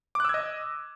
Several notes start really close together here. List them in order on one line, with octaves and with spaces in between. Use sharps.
D6 F#6 E6 G#6 D#5